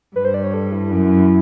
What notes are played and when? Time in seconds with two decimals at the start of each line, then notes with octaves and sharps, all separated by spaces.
0.16 G2 B4
0.25 C5
0.34 D5
0.44 C#5
0.54 A4
0.72 E4
0.91 F#2